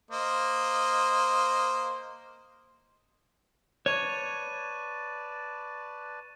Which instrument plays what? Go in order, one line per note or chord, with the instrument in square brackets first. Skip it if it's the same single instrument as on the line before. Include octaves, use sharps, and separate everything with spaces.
[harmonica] A#3 C5 D#5
[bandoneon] B4 D5 A5 [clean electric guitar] C#5 [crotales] C#6 D#7 E7